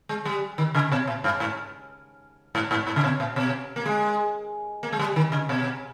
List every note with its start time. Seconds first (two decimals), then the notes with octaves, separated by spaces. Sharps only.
0.09 G#3
0.25 G3
0.58 D#3
0.75 C#3
0.92 B2
1.07 A#2
1.24 G2
1.40 G#2
2.55 G#2
2.71 G#2
2.87 G#2
2.96 C#3
3.04 B2
3.20 A#2
3.36 B2
3.76 A#3
3.86 G#3
4.83 A#3
4.92 G#3
4.99 G3
5.16 D#3
5.32 C#3
5.49 B2